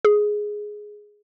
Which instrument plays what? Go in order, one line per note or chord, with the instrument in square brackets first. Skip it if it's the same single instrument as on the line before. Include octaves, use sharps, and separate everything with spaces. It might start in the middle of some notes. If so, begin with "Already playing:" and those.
[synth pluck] G#4